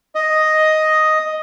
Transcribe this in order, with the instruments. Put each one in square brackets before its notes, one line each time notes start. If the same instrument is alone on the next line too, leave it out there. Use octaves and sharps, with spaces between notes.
[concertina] D#5